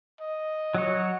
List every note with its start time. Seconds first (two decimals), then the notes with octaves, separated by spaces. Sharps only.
0.21 D#5
0.75 F#3 F#4 C#5